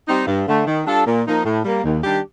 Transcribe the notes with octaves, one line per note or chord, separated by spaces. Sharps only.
G3 C4 D#4
G2
D3 A3
D#3
G3 D4 F4 A4
A#2
F3 A#3 D#4
A2
G3 A#3
D#2
D#3 G3 D4 G4